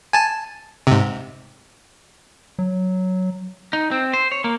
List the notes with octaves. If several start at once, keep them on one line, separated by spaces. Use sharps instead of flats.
G#5 A5
G#2 C3
F#3
D#4
C4
C5
C#5
A#3